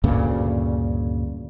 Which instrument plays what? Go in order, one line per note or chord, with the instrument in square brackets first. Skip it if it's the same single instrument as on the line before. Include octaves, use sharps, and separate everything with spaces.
[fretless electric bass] D2 G2 A#2 C#3